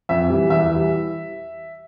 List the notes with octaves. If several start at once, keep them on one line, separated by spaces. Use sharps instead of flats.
F2 E5
E3 G3
E2 E5
E3 G3